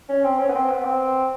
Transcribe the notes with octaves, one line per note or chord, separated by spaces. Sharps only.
C#4
C4
C#4
B3
C4
B3
C4